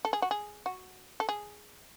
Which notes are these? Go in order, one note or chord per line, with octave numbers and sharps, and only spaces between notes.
A4
G#4
F#4
G#4
F#4
A4
G#4